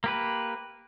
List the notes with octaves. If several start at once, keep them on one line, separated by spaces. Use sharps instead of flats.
A#3 G4 B4